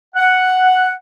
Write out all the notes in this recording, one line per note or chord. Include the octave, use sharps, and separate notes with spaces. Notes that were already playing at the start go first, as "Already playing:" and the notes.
F#5